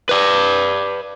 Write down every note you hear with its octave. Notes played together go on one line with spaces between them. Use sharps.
B4 D5